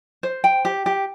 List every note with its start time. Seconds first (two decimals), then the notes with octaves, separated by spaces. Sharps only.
0.23 C5
0.44 G5
0.65 G4
0.86 G4